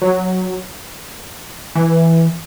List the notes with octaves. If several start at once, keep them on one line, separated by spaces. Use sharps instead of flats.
F#3
E3